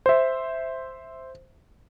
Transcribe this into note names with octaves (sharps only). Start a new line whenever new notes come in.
C5 E5